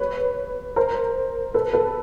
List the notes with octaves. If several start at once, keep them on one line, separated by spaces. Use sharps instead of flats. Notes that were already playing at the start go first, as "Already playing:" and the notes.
Already playing: B4 C#5
A#4 C5
A4 B4
A4 B4